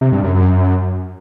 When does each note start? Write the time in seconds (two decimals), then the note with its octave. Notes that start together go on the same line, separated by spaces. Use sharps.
0.01 C3
0.12 G2
0.23 F#2
0.34 F#2